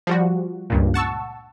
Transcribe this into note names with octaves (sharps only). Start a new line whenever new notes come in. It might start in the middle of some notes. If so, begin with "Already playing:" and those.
F3 G3 F#4
C#2 G2 A#2
F#5 A5 C#6 E6